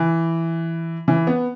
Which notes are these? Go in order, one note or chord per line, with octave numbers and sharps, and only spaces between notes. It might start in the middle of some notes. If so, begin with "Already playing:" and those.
Already playing: E3
E3
B3